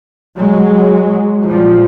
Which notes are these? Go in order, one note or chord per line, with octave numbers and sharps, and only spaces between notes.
F#3 G#3
A#2 F3 G3